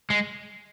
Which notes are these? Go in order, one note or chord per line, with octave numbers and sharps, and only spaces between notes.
G#3